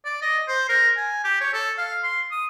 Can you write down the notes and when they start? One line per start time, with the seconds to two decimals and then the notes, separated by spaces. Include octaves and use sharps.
0.05 D5
0.22 D#5
0.48 C5
0.69 A#4
0.97 G#5
1.24 G4
1.41 C#5
1.54 A4
1.78 F5
2.03 C6
2.32 D#6